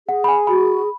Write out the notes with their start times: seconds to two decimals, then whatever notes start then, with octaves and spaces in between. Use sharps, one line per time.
0.08 G#4 F#5
0.24 B5
0.28 G#5
0.47 F#4 B5